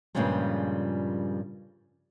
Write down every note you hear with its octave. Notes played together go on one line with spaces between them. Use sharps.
G2 A#2 C#3 F3 G3 G#3